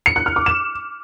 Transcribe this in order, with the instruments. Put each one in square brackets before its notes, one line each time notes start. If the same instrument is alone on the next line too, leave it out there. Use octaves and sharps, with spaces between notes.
[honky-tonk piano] C#7
F#6
F6
D6
E7